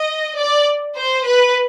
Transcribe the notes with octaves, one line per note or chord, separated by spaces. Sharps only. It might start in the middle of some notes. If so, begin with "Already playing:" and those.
Already playing: D#5
D5
C5
B4